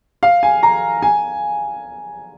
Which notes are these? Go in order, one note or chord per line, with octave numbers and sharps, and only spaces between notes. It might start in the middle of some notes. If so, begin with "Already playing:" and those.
F5
G#5
A#5
G#5